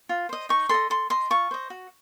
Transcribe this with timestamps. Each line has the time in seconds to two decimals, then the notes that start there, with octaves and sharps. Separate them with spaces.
0.09 F4
0.29 C5 D#5
0.49 D#4 C#6
0.69 A4 D#5 C6
0.90 A4 C6
1.10 D#5 C6
1.30 F4 C#6
1.51 C5 D#5
1.70 F#4